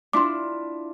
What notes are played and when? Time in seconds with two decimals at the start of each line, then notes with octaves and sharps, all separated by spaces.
0.13 D4 E4 F4 C6 D6